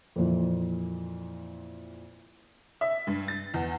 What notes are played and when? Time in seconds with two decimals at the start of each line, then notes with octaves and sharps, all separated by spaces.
0.16 F2 A#2 E3
2.81 E5
3.07 G2
3.28 A6
3.54 E2